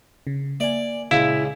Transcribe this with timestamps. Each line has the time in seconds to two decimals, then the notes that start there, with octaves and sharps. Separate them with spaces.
0.27 C#3
0.60 A#3 D5 E5 G#5
1.11 C#2 A#2 E4 F5